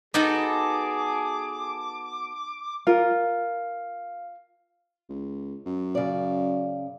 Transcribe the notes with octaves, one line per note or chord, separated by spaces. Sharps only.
B3 D#4 F#4 G#4 A4 D6
F4 A#4 F5
C#2
F#2
C#3 D5